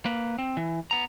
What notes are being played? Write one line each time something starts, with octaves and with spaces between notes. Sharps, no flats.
A#3 B4
C4
E3
B3 A#5